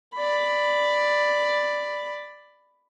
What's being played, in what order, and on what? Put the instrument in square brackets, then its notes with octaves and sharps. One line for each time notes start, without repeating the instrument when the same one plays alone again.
[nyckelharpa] D5 B5